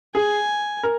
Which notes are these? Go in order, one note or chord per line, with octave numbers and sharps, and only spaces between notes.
G#4 G#5
A#4